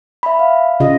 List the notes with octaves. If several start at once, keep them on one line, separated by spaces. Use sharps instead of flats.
E5 B5
F5
C#3 F4 D#5